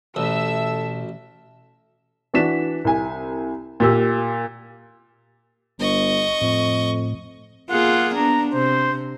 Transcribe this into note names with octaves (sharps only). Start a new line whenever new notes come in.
A1 B2 A4 E5 E6
E3 D4 F#4 B6 E7
C2 G#5
A#2 G4 E6
G1 D#5 C#6
F2 A2
A#3 F4 G#4 F#5
B3 D4 A#5
C3 C5